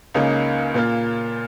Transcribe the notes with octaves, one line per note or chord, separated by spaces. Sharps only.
C#2 C#3 A#3 D#4
A#2 A#3 F4